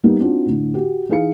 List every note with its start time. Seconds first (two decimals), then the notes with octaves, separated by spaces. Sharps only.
0.04 G3 A#3 B3 D#4
0.20 C4 D4 D#4 F4 F#4
0.46 A2 D3
0.74 F#4 G4
1.09 E3 D#4 G#4 F5 C#7